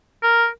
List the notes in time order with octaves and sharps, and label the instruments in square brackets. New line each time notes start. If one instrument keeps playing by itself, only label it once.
[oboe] A#4